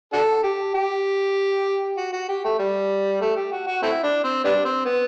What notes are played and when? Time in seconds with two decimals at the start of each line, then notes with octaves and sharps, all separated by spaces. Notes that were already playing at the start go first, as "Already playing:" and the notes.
0.13 D4 F#4 A4
0.43 G4
0.74 G4
1.97 F#4
2.13 F#4
2.29 G4
2.44 A3
2.59 G3
3.21 A3
3.36 G4
3.52 F#4
3.67 F#4
3.82 A3 C4 E4
4.03 D4
4.24 C4
4.44 G3 B3 D4
4.65 C4
4.85 B3